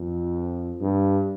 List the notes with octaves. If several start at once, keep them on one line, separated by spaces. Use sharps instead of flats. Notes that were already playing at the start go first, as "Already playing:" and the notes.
Already playing: F2
G2